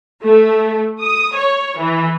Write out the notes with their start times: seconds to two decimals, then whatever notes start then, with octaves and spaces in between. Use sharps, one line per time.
0.23 A3
1.01 D#6
1.35 C#5
1.78 E3